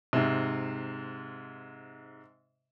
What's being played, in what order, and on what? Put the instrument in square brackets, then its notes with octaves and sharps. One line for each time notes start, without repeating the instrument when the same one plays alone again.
[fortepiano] G#2 C3